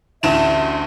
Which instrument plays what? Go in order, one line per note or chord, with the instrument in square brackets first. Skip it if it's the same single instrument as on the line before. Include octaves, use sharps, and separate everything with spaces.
[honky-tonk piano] A1 D2 E7 [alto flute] E5